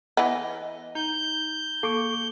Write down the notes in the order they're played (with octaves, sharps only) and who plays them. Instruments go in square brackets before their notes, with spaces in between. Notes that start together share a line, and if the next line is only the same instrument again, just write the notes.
[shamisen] E3 B3 [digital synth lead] D#5
[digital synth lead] D#4 [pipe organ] G6
[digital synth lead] A#3 [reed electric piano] A4 C#6 D6